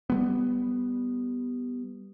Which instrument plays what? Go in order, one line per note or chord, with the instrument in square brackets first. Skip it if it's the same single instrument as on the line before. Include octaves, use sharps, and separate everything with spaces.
[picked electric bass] G3 G#3 B3